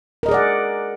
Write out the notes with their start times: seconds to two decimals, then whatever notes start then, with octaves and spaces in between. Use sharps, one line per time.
0.23 A#4
0.26 D#5
0.29 G#4
0.31 D5
0.34 F#5